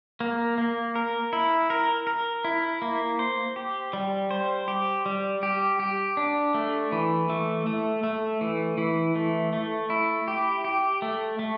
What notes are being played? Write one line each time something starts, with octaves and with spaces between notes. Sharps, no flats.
A#3
A#3
A#4
E4
A#4
A#4
E4
A#3
C5
G4
G3
C5
G4
G3
G4
G4
D4
A3
E3
A3
A3
A3
E3
E3
A3
A3
E4
G4
G4
A3
A3